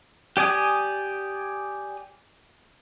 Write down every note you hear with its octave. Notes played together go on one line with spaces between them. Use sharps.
G4 D5 G#5 D#6